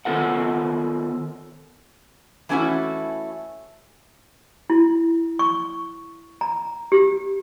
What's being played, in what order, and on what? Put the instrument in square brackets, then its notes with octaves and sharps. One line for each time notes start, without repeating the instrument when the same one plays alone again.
[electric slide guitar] D#3 F#3 B3 F4 A4 F#5
[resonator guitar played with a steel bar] E3 A3 C#4 D#4 E4 F#4
[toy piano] E4
C#6
A#5
G4